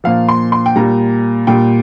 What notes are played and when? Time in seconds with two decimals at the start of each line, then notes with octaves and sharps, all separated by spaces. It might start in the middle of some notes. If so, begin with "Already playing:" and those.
0.04 A#2 F3 F5
0.29 C6
0.52 C6
0.66 G5
0.76 A#2 G3 A#5
1.47 A#2 G3 G5